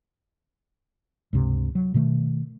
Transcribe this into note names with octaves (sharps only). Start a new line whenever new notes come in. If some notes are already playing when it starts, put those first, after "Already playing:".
C#2 G2 C3
F#3
B2 D#3 A3